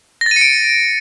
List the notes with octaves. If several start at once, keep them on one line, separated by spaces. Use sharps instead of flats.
A#6
A6
D#7
C#7
D7